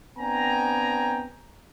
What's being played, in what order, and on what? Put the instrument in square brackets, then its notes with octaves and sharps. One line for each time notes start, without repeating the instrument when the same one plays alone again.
[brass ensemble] B3 C4 D4 G5 G#5 A#5